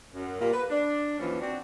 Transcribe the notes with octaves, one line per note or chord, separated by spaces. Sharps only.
F#2
A#2 G3 A#3
B4
D4
D#2 E3 F3 C#4
C4 D4 F#4